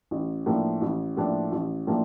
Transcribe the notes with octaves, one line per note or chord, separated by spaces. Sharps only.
A1
A2 F3 A#3 D4
A1
A2 F3 A#3 D4
A1
A2 F3 A#3 D4